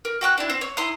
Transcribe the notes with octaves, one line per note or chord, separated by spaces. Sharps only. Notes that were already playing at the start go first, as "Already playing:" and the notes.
A#4
F#4 G5 D6 F#6
D4 E4
C4
C#5
E4 A#5 C6 D#6